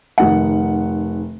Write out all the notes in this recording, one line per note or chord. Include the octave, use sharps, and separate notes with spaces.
F1 D#3 F#5